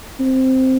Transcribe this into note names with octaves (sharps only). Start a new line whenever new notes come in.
C4